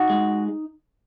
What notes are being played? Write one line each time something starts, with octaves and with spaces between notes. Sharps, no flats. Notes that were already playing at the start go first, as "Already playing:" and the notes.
Already playing: D#4 F#4
G#3